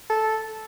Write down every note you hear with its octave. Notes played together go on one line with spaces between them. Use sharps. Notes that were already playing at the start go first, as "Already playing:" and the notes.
A4